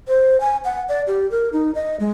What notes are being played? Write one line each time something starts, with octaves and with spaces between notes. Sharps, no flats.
C5
G#5
F#5
D5
G4
A#4
D#4
D#5
G#3